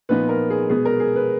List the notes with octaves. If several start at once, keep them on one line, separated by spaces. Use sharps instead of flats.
A#2 F3 B3 D#4 B4
A#4
G#4
B2 G#3 B3 G#4
A#4
G#4
B4